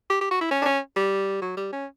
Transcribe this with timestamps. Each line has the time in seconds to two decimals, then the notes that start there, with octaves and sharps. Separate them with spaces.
0.10 G4
0.21 G4
0.31 F#4
0.41 E4
0.51 C#4
0.62 D4
0.66 C#4
0.96 G3
1.42 F#3
1.57 G3
1.72 C#4